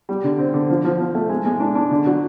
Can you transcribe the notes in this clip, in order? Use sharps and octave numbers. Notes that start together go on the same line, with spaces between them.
G3
D3
C4
D3
F3
F3
F3
A3
G#3
G#3
D4
D4
D3
F#3